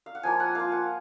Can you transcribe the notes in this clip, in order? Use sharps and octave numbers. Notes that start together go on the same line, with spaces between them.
F5
F#5
F3 A#3 F4 G#5
F#5
A#3 F4 F5
F#5